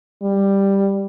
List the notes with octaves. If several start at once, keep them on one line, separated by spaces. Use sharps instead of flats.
G3